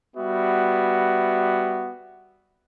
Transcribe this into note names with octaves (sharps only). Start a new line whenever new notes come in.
G3 B3 F#4 E5